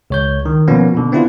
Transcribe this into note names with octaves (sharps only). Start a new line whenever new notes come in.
C#2 C#5 G6
D#3
B2 F3 A#3 B3 C#4
B2 D3
B3 C4 D4 E4 F4 B4